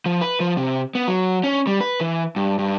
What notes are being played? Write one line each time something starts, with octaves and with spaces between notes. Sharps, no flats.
F3
B4
F3
C3
B3
F#3
C#4
G3
B4
E3
G2
G2